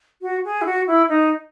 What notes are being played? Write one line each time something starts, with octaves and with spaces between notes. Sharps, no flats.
F#4
G#4
E4
F#4
E4
D#4